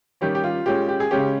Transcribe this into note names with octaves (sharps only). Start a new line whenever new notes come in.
D#3 G3 C#4 G4
G4
F4
A#2 G#3 C#4 G4
G4
G#4
C#3 G#3 C#4 G4